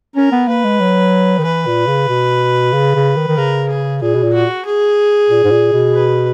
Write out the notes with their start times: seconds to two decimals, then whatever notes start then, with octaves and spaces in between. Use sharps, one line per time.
0.15 C#4 A#4
0.32 B3
0.48 A#3 B4
0.64 G#3
0.80 F#3
1.38 D#3
1.44 E3 B4
1.66 A#2
1.87 C#3
2.08 B2
2.73 C#3
2.95 C#3
3.16 D#3
3.27 D#3
3.37 C#3 A#4
3.69 G#4
4.01 A#2 G#4
4.15 B2
4.23 A#2
4.33 F#4
4.65 G#4
5.29 A#2
5.44 G#2
5.51 A#2
5.73 B2
5.94 B4